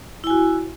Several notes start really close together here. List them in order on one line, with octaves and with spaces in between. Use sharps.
E4 G#5 F#4